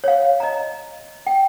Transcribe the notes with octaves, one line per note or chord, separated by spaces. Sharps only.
C#5 F5
D#5 A#5
G5